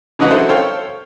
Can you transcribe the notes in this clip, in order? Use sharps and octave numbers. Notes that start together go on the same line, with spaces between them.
C#3 E3 G#3 D#4 F#4 B4
F#3 E4 A4 C5
A4 C5 C#5 F5 G5